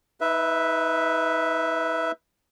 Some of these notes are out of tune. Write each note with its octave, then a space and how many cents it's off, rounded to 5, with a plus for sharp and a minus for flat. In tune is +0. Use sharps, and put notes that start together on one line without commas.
D#4 +35 B4 +0 E5 +0